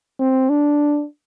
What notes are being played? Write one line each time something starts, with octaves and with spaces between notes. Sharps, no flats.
C4
D4